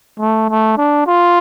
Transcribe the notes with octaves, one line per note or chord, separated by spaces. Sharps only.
A3
A3
D4
F4